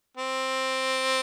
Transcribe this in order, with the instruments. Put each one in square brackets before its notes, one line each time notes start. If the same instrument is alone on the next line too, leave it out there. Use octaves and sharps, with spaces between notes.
[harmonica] C4